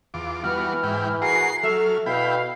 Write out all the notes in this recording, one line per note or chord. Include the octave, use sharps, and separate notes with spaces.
E2 F4 D6
E3 G3 B3 F#4 F6
G#2 E4 G5
F#4 G#4 A#4 C7
F#3 A4 E5 F6
B2 E4 F5 G5 B5